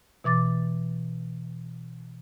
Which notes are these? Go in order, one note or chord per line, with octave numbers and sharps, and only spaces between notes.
B2 E3 D6 A6